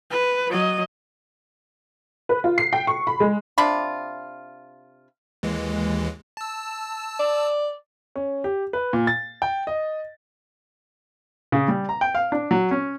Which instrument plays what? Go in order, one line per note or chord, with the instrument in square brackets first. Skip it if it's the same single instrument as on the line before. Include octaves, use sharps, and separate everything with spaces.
[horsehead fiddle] B4
F#3 D#5
[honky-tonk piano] B4
F4
C7
G5
C#6
B5
G#3
[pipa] C3 D4 F4 B5
[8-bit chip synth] D#2 E3 G#3
A5 E6
[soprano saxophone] D5
[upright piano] C#4
G4
B4
A#2
A6
G5
D#5
[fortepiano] C#3
G3
A#5
G5
F5
D4
F#3
C#4